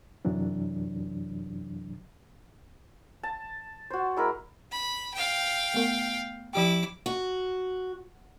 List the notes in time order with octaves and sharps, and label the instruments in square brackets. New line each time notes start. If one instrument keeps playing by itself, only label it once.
[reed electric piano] F#2 C3 E3 F#3 D4
[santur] A5
F#4 C5
G#3 E4 A#4
[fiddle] B5
F5 G5
[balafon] A3 B3 A#4
[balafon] F3 G4 G5 [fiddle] E4 D6
[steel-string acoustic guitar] F#4